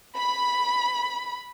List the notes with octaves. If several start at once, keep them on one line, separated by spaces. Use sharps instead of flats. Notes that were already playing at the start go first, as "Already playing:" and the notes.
B5